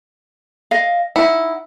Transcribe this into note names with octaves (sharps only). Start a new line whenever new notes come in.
D#5 F5
D#4 E4 F#5